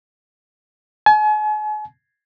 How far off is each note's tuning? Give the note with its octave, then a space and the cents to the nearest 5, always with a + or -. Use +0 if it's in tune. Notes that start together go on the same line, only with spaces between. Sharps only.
G#5 +40